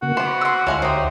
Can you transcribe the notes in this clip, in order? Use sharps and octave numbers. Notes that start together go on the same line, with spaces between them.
C#3 A#3 F#4
B3 C5 B5 D6
C6 E6
D2 F3 G#3 E4 A#4 C#5
D#4 F#4 G4 C5